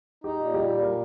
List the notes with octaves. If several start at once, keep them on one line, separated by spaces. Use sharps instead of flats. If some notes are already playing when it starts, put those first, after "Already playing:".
D#4 G4
A#2
G3 G4
A#2
G3 A#4